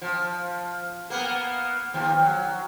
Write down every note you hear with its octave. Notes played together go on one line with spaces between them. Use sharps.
F3
A#3 B3
D#2 F3
F#3